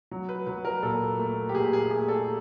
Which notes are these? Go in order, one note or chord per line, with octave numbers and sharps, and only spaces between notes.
F#3
B4
F#3 B4
A#4
A#2 A4
A3
G4
A#2 G#4
G4
G#4
A3 G#4
A4